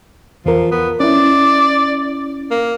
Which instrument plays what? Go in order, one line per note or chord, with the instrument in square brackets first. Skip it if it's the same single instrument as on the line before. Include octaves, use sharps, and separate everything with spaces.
[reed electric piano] E2 A#4 [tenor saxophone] F3
[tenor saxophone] B3
[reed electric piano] C#4 E4 [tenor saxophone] D5
[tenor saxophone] A#3